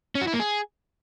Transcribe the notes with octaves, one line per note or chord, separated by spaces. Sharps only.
C#4
F#4
E4
A#3
G#4